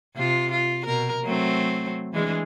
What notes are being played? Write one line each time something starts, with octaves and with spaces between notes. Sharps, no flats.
C3 F4
F4
B2 A#4
F#3 A3 C4
E3 G#3 D4